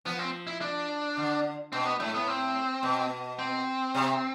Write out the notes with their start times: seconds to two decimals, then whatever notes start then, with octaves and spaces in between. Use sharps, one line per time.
0.05 F3 B3
0.19 C4
0.47 E4
0.61 D4
1.17 D3
1.72 B2 C4
1.86 B3
2.00 A2 A3
2.14 B3
2.28 C4
2.83 B2
3.39 C4
3.95 C3